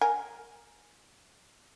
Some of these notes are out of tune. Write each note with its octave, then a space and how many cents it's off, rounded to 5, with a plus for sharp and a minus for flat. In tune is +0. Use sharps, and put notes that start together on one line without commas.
A#4 +0 G#5 +0